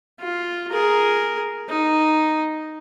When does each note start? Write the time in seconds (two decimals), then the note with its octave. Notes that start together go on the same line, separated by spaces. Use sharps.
0.20 F4
0.71 G#4 A#4
1.69 D#4